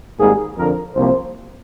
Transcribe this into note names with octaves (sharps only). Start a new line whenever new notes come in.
G#1 G#2 G3 A#3 G#4
F2 D3 F3 A#4
C2 C3 F3 A#3 C5